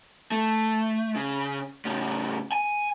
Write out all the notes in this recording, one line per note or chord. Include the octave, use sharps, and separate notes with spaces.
A3
C#3
A2 C#3
G#5